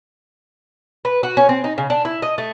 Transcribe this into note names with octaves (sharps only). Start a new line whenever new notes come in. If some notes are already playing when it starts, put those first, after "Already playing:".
B4
F#4
C#4
C4
D#4
C#3
D4
E4
D#5
A3